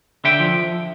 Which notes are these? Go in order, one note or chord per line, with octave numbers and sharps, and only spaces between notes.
D3 E5 G5
F3